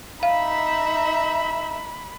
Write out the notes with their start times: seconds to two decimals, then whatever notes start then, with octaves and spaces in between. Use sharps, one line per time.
0.23 D#4 E5 F5 B5